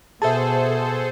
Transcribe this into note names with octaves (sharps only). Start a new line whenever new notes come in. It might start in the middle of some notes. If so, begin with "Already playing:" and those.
B2 G#4 A4 C5 E5 A5